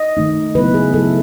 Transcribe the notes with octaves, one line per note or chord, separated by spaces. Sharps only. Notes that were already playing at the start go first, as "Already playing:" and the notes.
Already playing: D#5
D#3 A3 D#4
C#3 F#3 B3 E4 B4
G#4
C#3 F#3 B3 E4 A4